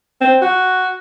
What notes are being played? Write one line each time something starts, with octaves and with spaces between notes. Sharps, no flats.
C4
F#4